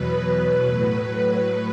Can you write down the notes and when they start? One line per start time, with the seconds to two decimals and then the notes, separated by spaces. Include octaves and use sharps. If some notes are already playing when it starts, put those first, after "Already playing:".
Already playing: E2 B2 F#3 B4
0.65 A2 F#3